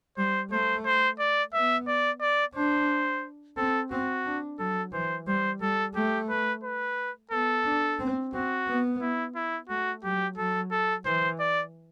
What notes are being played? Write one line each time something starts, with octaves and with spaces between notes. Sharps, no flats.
G3 C5
A3 C5
C5
D5
B3 E5
D5
D5
D4 C5
C4 A4
C4 F#4
D4
F#3 A4
E3 C5
G3 C5
G3 A4
A3 G4
B4
B4
B3 A4
D4
C4
C4 F#4
B3
E4
E4
A3 F#4
F#3 G4
F#3 A4
A4
E3 C5
D5